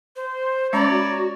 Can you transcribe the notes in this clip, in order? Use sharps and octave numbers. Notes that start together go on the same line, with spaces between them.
C5
G#3 C#4 C#5 D5 A#5 B5
F#4